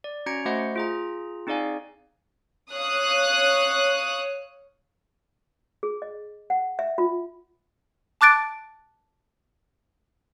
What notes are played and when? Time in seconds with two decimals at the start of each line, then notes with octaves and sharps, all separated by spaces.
0.04 D5
0.26 C#4 F#4 A#5 G#6 C#7 D7
0.45 A3 F#4 C5 D#5 F#5 G6
0.76 F4 G#4 A#5
1.47 C4 D#4 G#4 D5 F5 G#5
2.72 C#5 F5 D#6 F#6
5.83 G#4
6.02 D#5
6.50 F#5
6.79 E5
6.98 F4
8.21 A5 D6 F#6 A6 D7